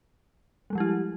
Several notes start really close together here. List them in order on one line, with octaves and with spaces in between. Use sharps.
G3 G#3 F3 G4 E4